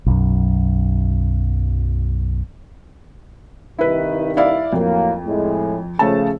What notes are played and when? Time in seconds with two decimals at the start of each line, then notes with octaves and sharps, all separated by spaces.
0.06 B1 F#2
3.79 C2 G2 D#3 E4 B4
4.37 E4 D5 F5
4.73 F2 A2 F#3 A#3
5.25 A2 G#3
5.99 C#3 F3 A3 A5